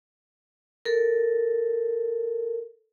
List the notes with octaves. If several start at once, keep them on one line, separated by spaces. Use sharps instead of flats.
A4 A#4